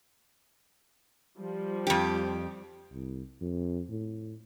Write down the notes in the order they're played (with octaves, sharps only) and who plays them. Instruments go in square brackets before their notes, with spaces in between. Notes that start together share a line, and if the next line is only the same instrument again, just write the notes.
[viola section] F3 G3
[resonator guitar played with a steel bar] F2 G4
[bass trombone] C2
F2
A2